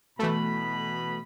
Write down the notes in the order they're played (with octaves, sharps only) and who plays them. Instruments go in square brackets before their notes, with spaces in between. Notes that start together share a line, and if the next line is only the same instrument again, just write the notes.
[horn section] B2 B5 [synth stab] E3 A3